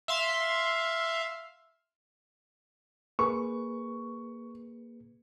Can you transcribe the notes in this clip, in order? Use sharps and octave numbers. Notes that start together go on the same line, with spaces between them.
E5 F5 C6
A#3 G#4 B4 C#6